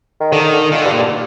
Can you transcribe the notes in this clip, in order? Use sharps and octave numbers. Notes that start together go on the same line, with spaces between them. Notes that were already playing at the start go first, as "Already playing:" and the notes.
D#3
D3 D#3
D3
A#2 D#3
G2 D3
A#2
G2